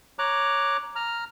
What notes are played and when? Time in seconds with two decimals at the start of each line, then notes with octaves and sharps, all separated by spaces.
0.19 C#5 A#5 D6 F#6
0.96 A#5 F6